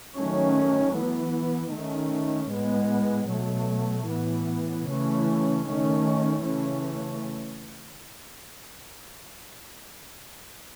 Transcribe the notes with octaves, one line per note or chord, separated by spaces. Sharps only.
D#3 F#3 A3 C#4
E3 B3
D#3 A3 C#4
A2 G#3 B3
B2 F#3 A3
A2 E3 B3
C#3 E3 A3 C#4
D#3 A3 C#4
C#3 E3 A3 C#4